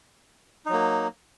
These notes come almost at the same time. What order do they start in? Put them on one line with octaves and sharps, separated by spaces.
D#4 F#3 A#3